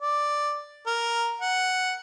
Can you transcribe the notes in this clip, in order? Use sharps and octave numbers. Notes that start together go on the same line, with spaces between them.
D5
A#4
F#5